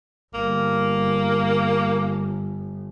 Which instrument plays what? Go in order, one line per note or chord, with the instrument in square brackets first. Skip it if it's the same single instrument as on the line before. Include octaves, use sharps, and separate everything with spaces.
[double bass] G1 [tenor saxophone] A#3